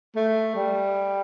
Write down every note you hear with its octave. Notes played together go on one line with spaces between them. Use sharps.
A3
G3